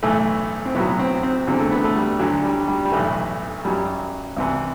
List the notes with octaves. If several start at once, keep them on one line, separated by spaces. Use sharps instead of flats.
B1 A2 E3 A3
C4
B1 A2 F#3 B3
C4
C4
E2 D3 F#3 C4
A3
B3
A3
G3
D2 D3 F#3
G3
G3
G3
B1 A2 E3 A3
F#2 F#3 G3
C2 C3 E3